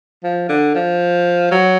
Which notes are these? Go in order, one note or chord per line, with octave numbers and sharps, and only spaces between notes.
F3
D3
F3
F#3